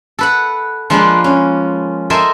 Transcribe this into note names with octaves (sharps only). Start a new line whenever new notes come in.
A4 B4 F#5
F3 G#3 A#3 D4 F4 B4
C#4
A4 A#4 C5 D#5 E5 G#5